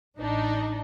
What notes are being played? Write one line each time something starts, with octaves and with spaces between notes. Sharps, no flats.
A1 D4 D#4